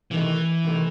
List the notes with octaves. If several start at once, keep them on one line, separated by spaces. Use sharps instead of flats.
C3 D#3 E3 A3 D#4
C3 D#3 A3 D#4